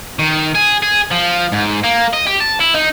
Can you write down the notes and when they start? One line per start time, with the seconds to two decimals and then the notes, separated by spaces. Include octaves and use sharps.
0.19 D#3
0.55 G#4
0.83 G#4
1.11 F3
1.52 G#2
1.83 A#3
2.13 D#5
2.26 G4
2.40 A5
2.60 E4
2.75 D#4